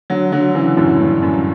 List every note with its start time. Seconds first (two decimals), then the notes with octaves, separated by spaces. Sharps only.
0.10 D3 F#3
0.32 D3 F#3
0.55 C#3 E3
0.77 F#2 A2
1.00 G2
1.22 F#2